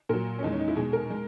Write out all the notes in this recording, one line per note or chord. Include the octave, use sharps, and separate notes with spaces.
A#2 F#3 A#4
C#4
E2 D#3 G#3 D#4
C#4
D#4
E4
B2 G#3 G#4
A#4
G#3